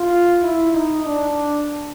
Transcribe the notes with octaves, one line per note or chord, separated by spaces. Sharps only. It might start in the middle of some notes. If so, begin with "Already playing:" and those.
Already playing: F4
E4
D#4
D4